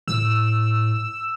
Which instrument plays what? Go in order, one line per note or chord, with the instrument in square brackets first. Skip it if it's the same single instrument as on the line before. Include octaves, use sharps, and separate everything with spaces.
[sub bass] A2 [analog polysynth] E6